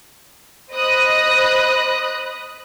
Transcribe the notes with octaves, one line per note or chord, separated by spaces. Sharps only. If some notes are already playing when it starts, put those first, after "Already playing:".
C5 D#5 B5 D#6 F#6 A#6